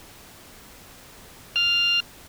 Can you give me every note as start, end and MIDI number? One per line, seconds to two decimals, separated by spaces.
1.56 2.00 89